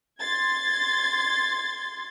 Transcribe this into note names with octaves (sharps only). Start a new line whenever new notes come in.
C6 G#6 A6